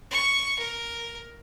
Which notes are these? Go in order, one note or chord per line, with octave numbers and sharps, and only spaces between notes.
C#6
A#4